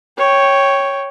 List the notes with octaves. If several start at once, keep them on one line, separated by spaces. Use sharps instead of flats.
C#5 G5